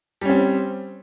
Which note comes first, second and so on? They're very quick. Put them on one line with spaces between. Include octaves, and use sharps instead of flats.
G3 C#4 C4